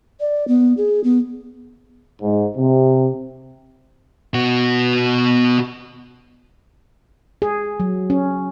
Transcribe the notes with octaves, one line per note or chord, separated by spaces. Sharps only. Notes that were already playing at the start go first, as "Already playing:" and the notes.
D5
B3
G#4
B3
G#2
C3
B2 F#4
G#4
F#3
C#4